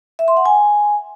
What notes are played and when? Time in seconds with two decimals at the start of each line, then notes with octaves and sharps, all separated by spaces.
0.19 E5
0.28 C6
0.37 F#5
0.46 G#5